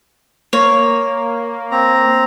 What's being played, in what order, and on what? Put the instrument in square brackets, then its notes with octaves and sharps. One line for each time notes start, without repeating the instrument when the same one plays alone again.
[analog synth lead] A#3 [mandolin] C#5
[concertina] C4 A#5